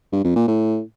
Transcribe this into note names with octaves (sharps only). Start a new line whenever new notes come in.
G2
F2
A#2
A2